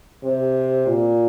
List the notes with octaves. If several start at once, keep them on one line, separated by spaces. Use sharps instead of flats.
C3
A#2